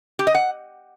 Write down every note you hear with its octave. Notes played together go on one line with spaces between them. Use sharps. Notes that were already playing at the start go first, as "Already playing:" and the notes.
G4
D#5
F#5